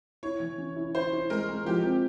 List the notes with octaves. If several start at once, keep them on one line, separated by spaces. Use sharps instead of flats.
E4 C#5
E3
C#4
E4
E4 C5
E4
G#3 A#4
G#3
F3 G4
C4